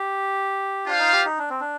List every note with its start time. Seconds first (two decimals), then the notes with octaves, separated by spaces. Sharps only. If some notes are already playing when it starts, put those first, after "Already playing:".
Already playing: G4
0.86 D4 F4 C5 F5
0.99 D#4
1.13 G4
1.25 D#4
1.39 D4
1.50 C4
1.61 D4